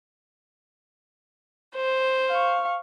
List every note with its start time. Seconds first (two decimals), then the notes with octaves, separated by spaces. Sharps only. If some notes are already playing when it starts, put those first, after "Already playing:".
1.74 C5
2.30 F5 C#6